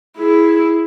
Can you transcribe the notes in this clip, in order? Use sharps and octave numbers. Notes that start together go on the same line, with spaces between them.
E4 G#4